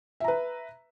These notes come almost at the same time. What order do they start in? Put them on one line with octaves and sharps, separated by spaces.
E5 A#5 B4